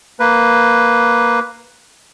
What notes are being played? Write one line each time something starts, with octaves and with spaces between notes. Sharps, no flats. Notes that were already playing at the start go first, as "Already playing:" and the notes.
A#3 B4